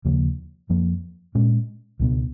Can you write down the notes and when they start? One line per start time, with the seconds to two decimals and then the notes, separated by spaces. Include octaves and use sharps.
0.05 D#2 C#3 F3 A#3
0.70 F2 F3 A#3
1.35 A#2 G#3 C#4
2.00 C#2 B2 G#3 B3